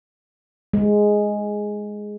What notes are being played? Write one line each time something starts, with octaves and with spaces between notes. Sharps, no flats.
G#3